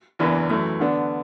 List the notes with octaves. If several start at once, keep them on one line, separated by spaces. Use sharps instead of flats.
F#1 E2 E3 D4 B4
F#2 E3 A3
D3 B3 D4